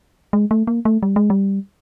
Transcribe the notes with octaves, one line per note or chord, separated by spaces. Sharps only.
G#3
A3
A#3
A3
G3
G#3
G3